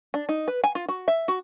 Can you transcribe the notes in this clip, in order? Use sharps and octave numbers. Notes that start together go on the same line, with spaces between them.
D4
D#4
B4
G#5
F4
F#4
E5
F#4